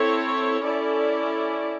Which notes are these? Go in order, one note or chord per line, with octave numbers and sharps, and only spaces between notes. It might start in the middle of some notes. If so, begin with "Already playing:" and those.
Already playing: C4 E4 A4 C#5
C#4 E4 A4 D5